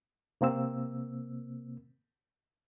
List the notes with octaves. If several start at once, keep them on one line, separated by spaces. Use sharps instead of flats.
C3 A#3 C4 E6